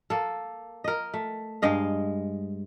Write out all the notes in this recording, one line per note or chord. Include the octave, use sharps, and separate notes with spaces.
A#3 A4
A#4 D#5
A3
G2 G#3 D#5 F5